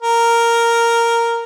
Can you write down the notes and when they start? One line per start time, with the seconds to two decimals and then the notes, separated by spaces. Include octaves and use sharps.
0.02 A#4